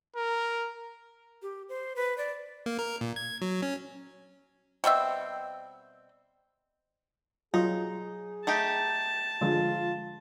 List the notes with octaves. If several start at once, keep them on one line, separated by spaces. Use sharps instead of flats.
A#4
G4
C5
B4
D5
A#3
A#4
A#2
G#6
F#3
C#4
B2 G3 C4 E5
F#3 D#4 F4 G#4
A3 D#4 G4 A5
D3 F3 G#3 F4